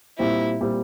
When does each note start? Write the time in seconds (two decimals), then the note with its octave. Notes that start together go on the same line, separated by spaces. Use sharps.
0.19 A#2 G3 C4 E4
0.61 A#2 G3 C4